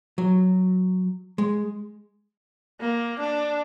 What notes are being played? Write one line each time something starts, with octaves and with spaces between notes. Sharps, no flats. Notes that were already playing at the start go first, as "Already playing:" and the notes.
F#3
G#3
A#3
D4